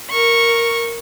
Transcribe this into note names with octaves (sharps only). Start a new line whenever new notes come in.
A#4 C#6